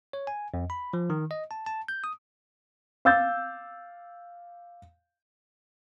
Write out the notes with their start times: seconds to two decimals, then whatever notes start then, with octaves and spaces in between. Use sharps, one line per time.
0.13 C#5
0.27 G#5
0.54 F2
0.70 B5
0.93 F3
1.10 D#3
1.31 D#5
1.51 A5
1.66 A5
1.88 G6
2.04 D#6
3.05 F5 D6 E6 G6 A6